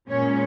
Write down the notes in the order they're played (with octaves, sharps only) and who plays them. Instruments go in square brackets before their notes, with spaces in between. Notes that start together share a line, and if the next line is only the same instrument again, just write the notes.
[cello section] A#2 G#3 C#4 C#5